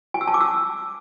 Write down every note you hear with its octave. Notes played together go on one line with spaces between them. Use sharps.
G#5
E6
A5
D6
E6